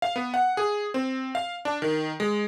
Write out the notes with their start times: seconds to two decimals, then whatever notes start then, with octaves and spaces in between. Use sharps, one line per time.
0.02 F5
0.16 B3
0.34 F#5
0.57 G#4
0.94 C4
1.35 F5
1.65 D4
1.82 D#3
2.20 G#3